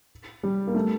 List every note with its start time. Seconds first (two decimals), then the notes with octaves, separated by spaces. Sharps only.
0.43 G3
0.67 A#3
0.75 A3